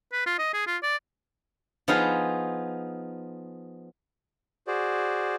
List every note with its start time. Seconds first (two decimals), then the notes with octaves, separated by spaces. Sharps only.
0.12 B4
0.26 F4
0.39 D#5
0.53 G#4
0.67 F4
0.83 D5
1.88 F3 B3 D#4 F4 G#4 F5
4.67 F#4 G#4 C5 D5